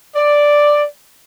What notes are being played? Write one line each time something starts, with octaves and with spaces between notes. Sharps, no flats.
D5